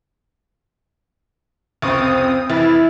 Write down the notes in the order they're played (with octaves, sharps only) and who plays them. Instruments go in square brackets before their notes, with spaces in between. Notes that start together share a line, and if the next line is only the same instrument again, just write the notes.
[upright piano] F1 C#2 C#6 [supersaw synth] C4 D#6
[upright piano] F1 E3 A6 [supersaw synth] E4